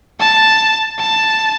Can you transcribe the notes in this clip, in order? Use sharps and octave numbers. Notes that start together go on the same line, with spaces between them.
A5
A5